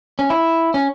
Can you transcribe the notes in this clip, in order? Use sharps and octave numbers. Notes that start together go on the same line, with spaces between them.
C#4
E4
C#4